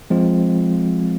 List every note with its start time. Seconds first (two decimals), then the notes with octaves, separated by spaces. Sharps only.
0.10 F3 G#3 C4 F4